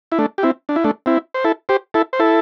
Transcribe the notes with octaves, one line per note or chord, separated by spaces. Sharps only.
E4
A3 D4
G4
C4 E4
D4
E4
A3 D4
C4 E4
C5
E4 A4
G4 C5
E4 A4
C5
E4 A4